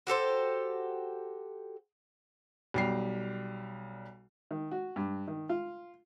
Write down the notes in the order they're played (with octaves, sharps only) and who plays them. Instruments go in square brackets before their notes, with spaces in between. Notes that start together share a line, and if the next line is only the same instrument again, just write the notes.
[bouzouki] F#4 G4 A4 C5
[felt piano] B1 G3 C7
[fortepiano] D#3
F#4
G2
D#3
F4